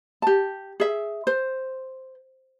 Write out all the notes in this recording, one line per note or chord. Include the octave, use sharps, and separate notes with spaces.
G4 A5
G#4 E5
C5